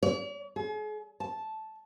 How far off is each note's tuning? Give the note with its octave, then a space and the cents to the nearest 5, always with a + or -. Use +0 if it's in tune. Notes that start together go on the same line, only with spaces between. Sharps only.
D5 -45
G#4 +40
A5 -5